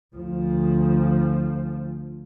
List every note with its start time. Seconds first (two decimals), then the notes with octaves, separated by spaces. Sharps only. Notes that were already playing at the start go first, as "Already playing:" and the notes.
0.16 D2 F3